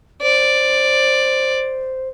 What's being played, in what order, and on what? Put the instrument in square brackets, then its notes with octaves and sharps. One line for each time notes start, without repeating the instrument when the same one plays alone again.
[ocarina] C5 [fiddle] D5